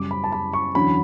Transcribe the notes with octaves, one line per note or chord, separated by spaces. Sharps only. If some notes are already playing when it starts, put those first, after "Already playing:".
Already playing: F#2 C#3 G3 D6
B5
A5
B5
C#6
E2 D3 F#3 C#4 B5